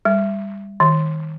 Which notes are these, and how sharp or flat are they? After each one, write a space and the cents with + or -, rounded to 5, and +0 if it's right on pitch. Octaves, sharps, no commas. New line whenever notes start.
G3 +25
D#3 +15